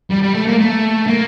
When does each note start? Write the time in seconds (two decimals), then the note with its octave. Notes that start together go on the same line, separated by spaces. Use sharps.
0.10 G3
0.22 G3
0.34 A3
0.47 A#3
0.59 A3
1.07 A#3